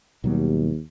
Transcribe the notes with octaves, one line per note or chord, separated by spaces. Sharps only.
D#2 B2 F#3 G3